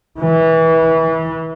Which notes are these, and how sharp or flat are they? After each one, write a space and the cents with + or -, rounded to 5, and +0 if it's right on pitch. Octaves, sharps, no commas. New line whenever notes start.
E3 -25